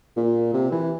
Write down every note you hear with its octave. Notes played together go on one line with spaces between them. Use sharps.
A#2
C3
E3